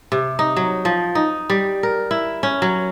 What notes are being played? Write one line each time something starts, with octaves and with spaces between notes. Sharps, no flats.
C3
D#4
F#3
F3
D#4
G3
A#4
E4
C#4
F#3